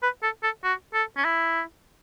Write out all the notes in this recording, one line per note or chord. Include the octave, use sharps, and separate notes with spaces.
B4
A4
A4
F#4
A4
C#4
E4